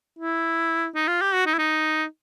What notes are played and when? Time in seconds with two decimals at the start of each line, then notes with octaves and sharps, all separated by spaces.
0.19 E4
0.95 D#4
1.08 F4
1.21 G4
1.34 F#4
1.47 D#4
1.54 E4
1.59 D#4